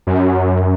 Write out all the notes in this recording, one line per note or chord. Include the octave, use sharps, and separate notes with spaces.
F#2